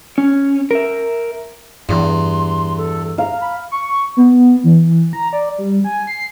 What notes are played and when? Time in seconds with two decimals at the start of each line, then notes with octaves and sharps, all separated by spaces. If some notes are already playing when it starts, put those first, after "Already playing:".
0.18 C#4
0.71 A#4 E5
1.89 E2 G2 C6
2.77 A4
3.18 F5 A#5
3.41 B5
3.71 C#6
4.17 B3
4.64 E3
5.13 A#5
5.33 D5
5.58 G3
5.84 G#5
6.07 C7